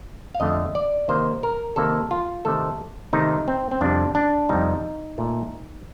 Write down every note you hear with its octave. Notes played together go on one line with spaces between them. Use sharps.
F5
F2 D3 A3 D#5
D5
C3 D#3 A#3 C5
A#4
C3 D#3 A#3 A4
F4
C3 D#3 A3 A4
C3 D#3 A3 D#4
C4
C4
F2 C3 G3 D4
D4
F2 C3 G3 D#4
A#2 A3